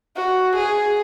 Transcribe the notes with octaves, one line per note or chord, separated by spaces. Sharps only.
F#4
G#4